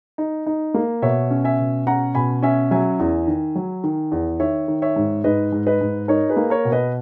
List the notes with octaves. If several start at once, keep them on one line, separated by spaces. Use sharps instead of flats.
D#4
D#4
A#3
B2 C#5 E5
C#4
E5 G#5
B2
C#4 F#5 A#5
B2 G#5 B5
C#4 E5 G#5
F#3 E5 G#5
E2
D#3
F#3
D#3
E2
D#3 C#5 E5
D#3
C#5 E5
G#2
G#2 B4 D#5
G#2
B4 D#5
G#2
D#4 A#4 C#5
G#4 B4
A#3
A#4 C#5
B2
B4 D#5